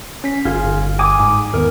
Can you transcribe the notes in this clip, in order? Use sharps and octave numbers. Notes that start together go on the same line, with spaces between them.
C#4 B6
G1 F4 G#4
G1
G#5 D6 D#6
G#2
E2 D#3 B3 A#4